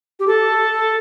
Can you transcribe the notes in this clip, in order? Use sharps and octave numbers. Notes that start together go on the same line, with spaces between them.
G4
A4